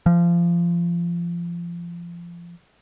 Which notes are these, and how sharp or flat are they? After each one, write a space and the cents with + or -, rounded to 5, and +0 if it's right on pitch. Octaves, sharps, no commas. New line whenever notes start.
F3 -25